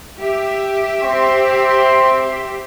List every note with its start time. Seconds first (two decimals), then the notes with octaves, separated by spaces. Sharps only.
0.20 G4 E5
1.03 C4 C6